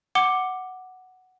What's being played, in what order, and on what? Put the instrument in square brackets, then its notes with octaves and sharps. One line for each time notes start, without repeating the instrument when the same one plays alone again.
[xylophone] F#5 D6 G7